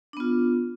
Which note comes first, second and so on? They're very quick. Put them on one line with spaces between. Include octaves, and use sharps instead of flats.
D4 B3 F4